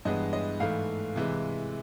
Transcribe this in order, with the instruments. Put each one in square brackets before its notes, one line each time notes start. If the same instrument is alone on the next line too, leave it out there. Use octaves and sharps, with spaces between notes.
[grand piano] G2 E3 G#3 B3 D#5
D#5
G#2 E3 A3 F5
C3 E3 G#3